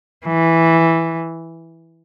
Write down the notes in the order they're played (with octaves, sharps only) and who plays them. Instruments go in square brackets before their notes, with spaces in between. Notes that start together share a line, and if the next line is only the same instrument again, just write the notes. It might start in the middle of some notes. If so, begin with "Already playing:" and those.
[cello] E3